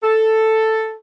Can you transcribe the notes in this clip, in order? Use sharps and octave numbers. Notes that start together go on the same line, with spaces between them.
A4